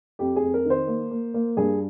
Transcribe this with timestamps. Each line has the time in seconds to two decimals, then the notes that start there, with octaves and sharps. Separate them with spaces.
0.19 F2 G4
0.36 G#4
0.42 F2
0.54 A#4
0.65 D#3
0.70 C5
0.87 A#3
1.11 A#3
1.34 A#3
1.57 G2 G#4